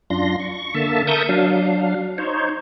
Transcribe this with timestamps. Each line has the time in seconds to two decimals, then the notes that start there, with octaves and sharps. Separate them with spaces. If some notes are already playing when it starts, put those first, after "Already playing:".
0.10 F#2 D4 F4 C6 A#6
0.40 C#6
0.74 D3 A#3 E5 A5
1.07 A#4 E5 A5 C#6 D#6 G6
1.29 F#3 D4 F5
2.18 D#4 C5 C#5